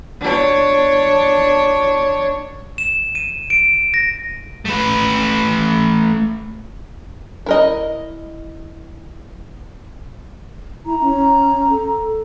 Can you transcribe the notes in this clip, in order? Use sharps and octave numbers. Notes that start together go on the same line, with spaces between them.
D4 C#5
E7
D#7
D7
A#6
A3 B4
E4 A#4 D#5
E4 A#5
C#4
A4